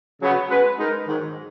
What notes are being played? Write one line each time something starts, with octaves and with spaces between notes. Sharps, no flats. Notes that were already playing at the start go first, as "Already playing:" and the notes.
C#3 F#3 B3
G#3 C#4 F#4 B4
G#3 D#4 A#4
G#2 D#3 F#3